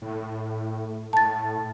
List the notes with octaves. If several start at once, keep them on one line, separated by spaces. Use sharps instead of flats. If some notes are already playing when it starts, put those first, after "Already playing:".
A2
A2 A5 A6